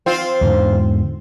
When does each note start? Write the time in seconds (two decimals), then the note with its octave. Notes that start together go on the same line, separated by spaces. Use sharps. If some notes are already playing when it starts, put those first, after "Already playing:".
0.06 C4 F4
0.41 E2 G#2 D3